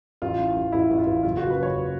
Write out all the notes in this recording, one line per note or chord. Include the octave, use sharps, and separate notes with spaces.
A1 F4
E3
A1
A1 E4
A1
F4
A1
F#1 F4
F#1 F#4
B4
F#1 C#5
F#1